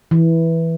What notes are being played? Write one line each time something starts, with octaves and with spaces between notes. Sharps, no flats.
E3